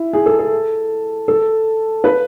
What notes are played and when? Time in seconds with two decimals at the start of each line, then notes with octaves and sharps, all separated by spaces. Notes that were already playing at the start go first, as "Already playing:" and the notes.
Already playing: E4
0.13 G#4
0.26 A4
0.39 A4
1.28 A4
2.04 B4